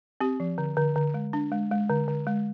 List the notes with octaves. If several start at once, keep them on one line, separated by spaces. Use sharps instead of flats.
C4 G4
F3
D3
D3
D3
G#3
D4
G#3
G#3
D3
D3
G#3